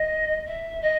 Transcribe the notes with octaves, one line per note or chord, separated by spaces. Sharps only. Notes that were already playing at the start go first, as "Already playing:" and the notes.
Already playing: D#5
E5
D#5